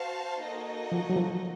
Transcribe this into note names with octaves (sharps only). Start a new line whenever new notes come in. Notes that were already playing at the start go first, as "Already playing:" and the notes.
Already playing: F#4 C5 F5 A5
A#3 D#4 F#4 A4 D#5
F3
F#3
F3